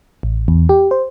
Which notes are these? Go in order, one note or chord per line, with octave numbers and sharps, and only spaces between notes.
A1
E2
G4
C5